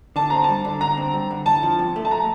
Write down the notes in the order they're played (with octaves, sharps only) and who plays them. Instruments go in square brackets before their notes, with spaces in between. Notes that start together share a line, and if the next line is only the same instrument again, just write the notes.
[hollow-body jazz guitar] D3 [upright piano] A5
[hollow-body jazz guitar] C4 [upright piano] A#5
[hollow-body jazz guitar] G3 [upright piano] A5
[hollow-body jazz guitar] D3
[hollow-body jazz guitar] D3 [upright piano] A#5
[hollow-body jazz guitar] C4
G3
D3
[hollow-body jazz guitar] C2 [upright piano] A5
[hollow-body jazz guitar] F3
C3
A3
[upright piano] A5
A#5